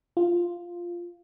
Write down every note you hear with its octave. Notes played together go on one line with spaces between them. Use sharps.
F4